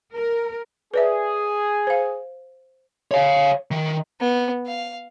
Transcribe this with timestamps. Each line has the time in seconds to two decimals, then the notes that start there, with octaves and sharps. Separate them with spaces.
0.13 A#4
0.94 G#4 B4 D5 E5
1.87 C5 F5
3.11 C#5 F5
3.71 D#3
4.20 B3
4.67 F5